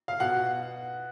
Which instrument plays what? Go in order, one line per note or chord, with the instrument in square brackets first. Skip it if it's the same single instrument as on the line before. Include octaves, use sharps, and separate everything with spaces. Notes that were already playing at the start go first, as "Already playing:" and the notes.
[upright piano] F5
B2 F#5